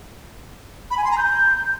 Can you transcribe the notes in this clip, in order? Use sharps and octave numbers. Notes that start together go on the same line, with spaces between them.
B5
G#5
C6
A#5
G6